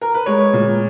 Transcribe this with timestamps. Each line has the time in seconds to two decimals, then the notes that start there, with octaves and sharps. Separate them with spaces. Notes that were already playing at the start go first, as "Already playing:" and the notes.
0.01 A#4
0.14 B4
0.26 G#3 C#5
0.53 A#2